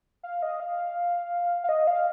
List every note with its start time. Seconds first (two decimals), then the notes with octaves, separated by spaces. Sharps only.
0.23 F5
0.42 D#5
0.60 F5
1.64 F5
1.69 D#5
1.87 F5